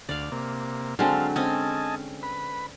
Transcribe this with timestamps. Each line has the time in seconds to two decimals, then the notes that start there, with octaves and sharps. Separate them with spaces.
0.09 D2 D5 F5
0.32 C3 A#3
0.99 D3 F#3 G#3 C4 F5 A5
1.36 C4 C#4 D#5 G#5 A5
2.23 B4 B5